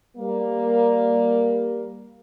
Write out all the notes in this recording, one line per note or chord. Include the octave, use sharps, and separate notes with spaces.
G3 A#3